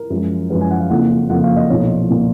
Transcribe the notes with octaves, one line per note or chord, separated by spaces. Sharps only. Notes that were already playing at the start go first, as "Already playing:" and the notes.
Already playing: A#4
F#2 F3 G#3
F#2 F3 G#3 B4
G#5
F#5
F5
F#1 F2 F3 A#3 F#5
F#1 F2 F3 A#3 F#5
F5
D#5
B1 A#2 F3 A#3 C#5
A#2 F3 A#3